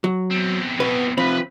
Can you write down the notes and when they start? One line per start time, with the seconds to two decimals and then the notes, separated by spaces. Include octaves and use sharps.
0.04 F#3
0.31 E2 C4
0.80 B2 B3 B4
1.18 C3 F3 C4 B4 B5